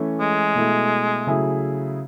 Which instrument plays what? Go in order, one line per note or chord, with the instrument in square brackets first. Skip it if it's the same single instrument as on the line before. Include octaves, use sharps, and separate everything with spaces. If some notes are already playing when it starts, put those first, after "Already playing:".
Already playing: [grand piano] E3 A3 C#4
[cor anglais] G#3
[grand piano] B2 A3 E4
C#3 F#3 A3 E4 G#4